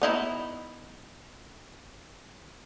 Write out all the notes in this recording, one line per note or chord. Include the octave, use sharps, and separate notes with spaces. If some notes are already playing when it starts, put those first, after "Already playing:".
B3 D#4 E4